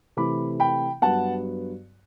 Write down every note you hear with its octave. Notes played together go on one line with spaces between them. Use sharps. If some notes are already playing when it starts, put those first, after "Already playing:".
C3 E3 A3 E4 B5 D6
G5 B5
G2 F#3 B3 F#5 A5